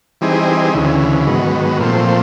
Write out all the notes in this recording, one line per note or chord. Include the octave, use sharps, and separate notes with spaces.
E3 G3 C4 D#4 G#4
D2 C#3 E3
G#2 D#3 F#3 B3
A#2 F3 A3 C4